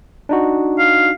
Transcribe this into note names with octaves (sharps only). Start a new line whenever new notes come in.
D4 D#4 F#4
F5